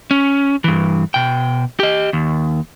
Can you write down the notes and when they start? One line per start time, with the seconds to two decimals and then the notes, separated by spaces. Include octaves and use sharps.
0.11 C#4
0.64 G2 E3
1.14 B2 G5
1.80 G4 D#5
2.13 D#2